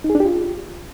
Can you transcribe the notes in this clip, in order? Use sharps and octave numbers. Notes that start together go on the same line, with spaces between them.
D#4
G#4
D4
G4
F4